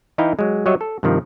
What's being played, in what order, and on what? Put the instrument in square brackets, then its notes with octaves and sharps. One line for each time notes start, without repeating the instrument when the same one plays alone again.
[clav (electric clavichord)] E3 D#4 E4 D#5 F5 G5
F#3 G#3
F#3 G3 C#5 D#5 E5
A4
G2 C3 D#3 F3